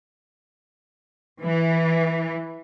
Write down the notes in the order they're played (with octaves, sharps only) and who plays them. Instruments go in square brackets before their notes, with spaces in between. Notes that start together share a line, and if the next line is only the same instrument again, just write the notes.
[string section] E3